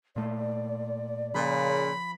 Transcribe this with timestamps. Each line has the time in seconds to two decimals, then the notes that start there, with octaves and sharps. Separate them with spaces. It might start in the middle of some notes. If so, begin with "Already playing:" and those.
0.16 A#2 A3 D5
1.34 A#2 C#3 F3 B5